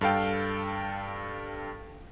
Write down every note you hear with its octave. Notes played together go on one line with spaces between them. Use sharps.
G2 A4 F5 G5